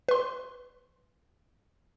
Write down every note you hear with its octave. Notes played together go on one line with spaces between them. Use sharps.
B4 C6